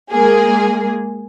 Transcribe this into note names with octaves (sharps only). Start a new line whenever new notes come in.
G#3 A#3 G#4